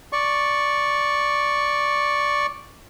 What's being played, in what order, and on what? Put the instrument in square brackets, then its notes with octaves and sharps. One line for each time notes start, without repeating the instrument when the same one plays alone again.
[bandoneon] D5 C#6